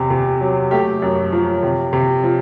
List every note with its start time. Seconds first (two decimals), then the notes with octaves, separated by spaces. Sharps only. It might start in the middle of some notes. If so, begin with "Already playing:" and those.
Already playing: E2 C3
0.10 C3
0.41 F#3
0.71 A3 G4
1.02 F#2
1.32 F3
1.63 C3
1.93 C3
2.24 F3